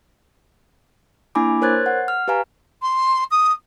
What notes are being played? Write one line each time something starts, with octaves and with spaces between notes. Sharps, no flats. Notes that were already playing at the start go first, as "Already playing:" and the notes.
A#3 D4 E4 G#5 B5 D6
A#4 C5 C#5 F#6 G#6 A6
F#5
F6
G4 B4 F5 G#5 A#5
C6
D#6